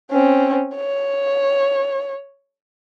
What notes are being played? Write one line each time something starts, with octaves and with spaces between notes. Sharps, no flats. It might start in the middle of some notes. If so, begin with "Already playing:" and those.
C4 C#4
C#5